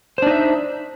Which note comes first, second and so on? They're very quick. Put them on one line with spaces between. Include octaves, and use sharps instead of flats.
C5 D4 D#4 E5